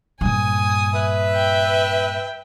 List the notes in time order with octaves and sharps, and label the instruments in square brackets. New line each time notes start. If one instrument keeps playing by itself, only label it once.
[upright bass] G2 A#2 [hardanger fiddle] G#5 D#6
[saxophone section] B4 E5
[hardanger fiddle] G5